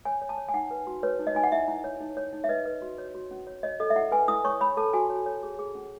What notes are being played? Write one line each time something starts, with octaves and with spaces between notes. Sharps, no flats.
C#5 G#5
C#5
A5
C#5
G#5
D#4 F#5
B4
F#4
B4 C#5
D#4
D#5
D#4 G#5
F#5
E4 E5
E4
C#5
D#4
C#5
D#4
E5
B4 D#5
B4
F#4
C#5
F#4
C#4
C#5
C#5 D#5
A4 D#5
E5
E4 F#5
B4 G#5
E4 D#6
C#5 C#6
C#5 B5
A4 A5
F#4 G#5
C#5
C#5
G#4
G#4
C#4